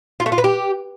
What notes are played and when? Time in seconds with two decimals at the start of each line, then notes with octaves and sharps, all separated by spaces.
0.20 F4
0.26 A3
0.32 F4
0.38 B4
0.44 G4